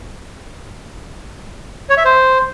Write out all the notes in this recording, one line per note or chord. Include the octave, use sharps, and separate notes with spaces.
C#5
E5
C5